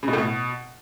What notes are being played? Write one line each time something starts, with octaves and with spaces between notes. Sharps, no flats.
C#3
B2
A2
B2